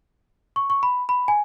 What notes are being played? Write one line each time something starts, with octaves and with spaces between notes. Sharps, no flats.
C#6
C#6
B5
B5
G#5